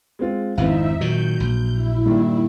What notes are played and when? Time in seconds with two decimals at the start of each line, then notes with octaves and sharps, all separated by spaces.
0.19 G#3 C4 F4
0.58 G#1 F2 C4 D#4 E4 E5 F5
1.01 A#2 D#3 F#3 G6
1.40 A#1
1.74 E4
2.06 G2 A#2 D#3